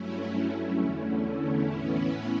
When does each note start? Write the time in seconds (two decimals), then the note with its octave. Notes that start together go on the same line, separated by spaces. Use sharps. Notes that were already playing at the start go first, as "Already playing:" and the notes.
Already playing: G2 F#3 A3 C#4 E4
0.80 E2 D3 A3
1.69 A2 E3 B3 C#4 E4